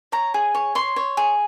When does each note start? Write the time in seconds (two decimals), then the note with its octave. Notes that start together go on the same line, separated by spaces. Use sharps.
0.12 C#5 A#5
0.34 G#4
0.55 C#5
0.75 C#5 C6
0.96 C#5
1.17 G#4